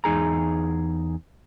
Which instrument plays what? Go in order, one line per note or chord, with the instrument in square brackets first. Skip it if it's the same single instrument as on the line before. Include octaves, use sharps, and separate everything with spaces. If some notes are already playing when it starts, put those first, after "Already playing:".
[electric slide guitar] E2 D#4 G#4 A#5